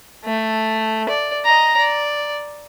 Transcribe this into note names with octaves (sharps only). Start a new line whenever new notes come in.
A3
D5
D#5 A#5
D5